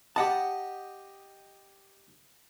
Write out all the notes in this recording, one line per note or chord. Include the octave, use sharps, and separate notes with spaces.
G4 D#5 F#5 A5